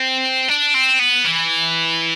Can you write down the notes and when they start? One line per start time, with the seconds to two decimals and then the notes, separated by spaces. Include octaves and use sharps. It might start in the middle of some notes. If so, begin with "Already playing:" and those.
Already playing: C4
0.48 D4
0.74 C4
0.99 B3
1.24 E3